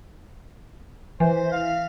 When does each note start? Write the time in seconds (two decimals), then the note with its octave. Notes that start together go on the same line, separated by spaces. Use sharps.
1.20 E3 C5
1.52 F5